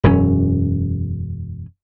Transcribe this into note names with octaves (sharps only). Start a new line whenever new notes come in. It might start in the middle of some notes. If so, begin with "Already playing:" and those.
E1 F#2 F3 C#4